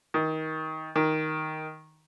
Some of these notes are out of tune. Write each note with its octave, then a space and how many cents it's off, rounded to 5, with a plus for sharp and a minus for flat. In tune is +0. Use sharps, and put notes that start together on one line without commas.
D#3 +20
D#3 +5